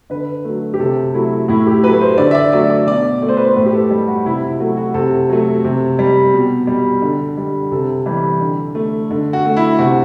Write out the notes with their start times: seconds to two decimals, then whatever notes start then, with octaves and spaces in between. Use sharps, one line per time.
0.10 D3 B4
0.45 F#3 A3
0.74 G4
0.80 C3 A4
1.14 F#3 A3 E4
1.48 A2 E4
1.67 G4
1.84 F#3 A3 B4
2.01 C5
2.17 D3 D5
2.31 E5
2.35 D5
2.53 F#3 A3 D5
2.70 D5
2.87 B2 D5
3.22 A3 D5
3.29 C5
3.37 B4
3.44 C5
3.56 A2 B4
3.66 G4
3.74 A4
3.91 G3
4.08 F#4
4.26 C3 E4
4.43 E4
4.60 F#3 A3 F#4
4.77 F#4
4.94 C3 A4
5.29 F#3 A3
5.64 C3
5.99 G3
6.34 B2
6.67 G3
7.02 D3
7.38 G3
7.71 C3 A4
8.06 E3 G3
8.41 D3
8.75 A3
9.11 D3
9.33 F#4
9.45 A3
9.57 E4
9.79 C3 F#4